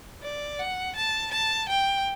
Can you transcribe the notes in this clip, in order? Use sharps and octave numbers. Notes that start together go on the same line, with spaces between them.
D5
F#5
A5
A5
G5